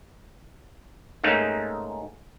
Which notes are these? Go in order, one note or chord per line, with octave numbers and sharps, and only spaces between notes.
G#2 A3 A#3 C#4 D#4